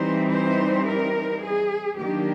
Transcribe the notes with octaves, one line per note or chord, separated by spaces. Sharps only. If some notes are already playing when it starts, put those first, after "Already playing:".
Already playing: E3 G3 C4 D#4 C5
C5
A#4
G#4
D#3 F#3 A#3 D4 G4